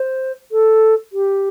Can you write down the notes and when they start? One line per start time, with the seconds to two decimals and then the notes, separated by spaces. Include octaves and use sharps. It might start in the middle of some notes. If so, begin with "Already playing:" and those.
Already playing: C5
0.52 A4
1.13 G4